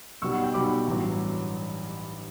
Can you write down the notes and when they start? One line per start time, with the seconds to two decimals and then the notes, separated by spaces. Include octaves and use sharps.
0.22 B1 B2 G3 B3 C#6 E6
0.33 F#5
0.44 G5
0.54 B1 B2 G3 B3 B5 D6
0.87 A1 G2 F#3